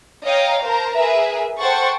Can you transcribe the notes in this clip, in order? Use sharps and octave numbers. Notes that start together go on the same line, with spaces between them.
C#5 D#5 F5 G5 A#5
A#4 C5 A5 A#5
G#4 A#4 B4 E5
A4 C5 F#5 G5 C#6 A6